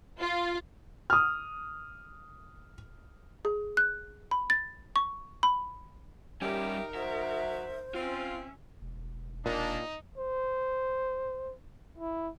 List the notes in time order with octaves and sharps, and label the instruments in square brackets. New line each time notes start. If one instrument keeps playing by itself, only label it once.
[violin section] F4
[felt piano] D#6 F6
[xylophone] G#4
F#6
B5
A6
C#6
B5
[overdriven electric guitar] G3 C#4 [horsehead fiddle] D#4 A#4 [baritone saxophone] G4 [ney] E5
[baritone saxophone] F#3 [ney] C5 [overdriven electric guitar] E5
[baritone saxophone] C4 [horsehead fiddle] C#4 E5 [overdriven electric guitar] F4
[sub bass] E1
[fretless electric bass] A#2 [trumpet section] A#3 D4 [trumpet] D#4
[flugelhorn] C5
E4